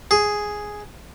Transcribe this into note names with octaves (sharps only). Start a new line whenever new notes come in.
G#4